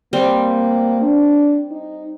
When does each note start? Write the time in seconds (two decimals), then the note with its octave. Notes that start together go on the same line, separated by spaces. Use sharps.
0.13 G3 A#3 C4
1.02 D4
1.71 D#4